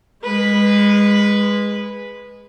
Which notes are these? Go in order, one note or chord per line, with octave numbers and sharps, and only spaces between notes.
G#3 B4